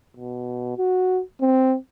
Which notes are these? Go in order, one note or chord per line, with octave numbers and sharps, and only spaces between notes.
B2
F#4
C4